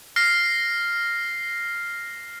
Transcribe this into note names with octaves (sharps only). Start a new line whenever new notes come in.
F6 A#6 C7